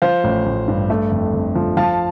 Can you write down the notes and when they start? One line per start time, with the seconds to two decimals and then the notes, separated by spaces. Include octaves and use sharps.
0.02 F3 C5 F5
0.24 A1
0.46 A1
0.68 G2
0.90 A3
1.11 F2
1.34 F2
1.55 F3
1.77 F3 F5 A5